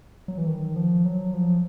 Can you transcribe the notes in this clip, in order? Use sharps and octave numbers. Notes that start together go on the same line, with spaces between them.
F#3
E3
D#3
F3
F#3
F3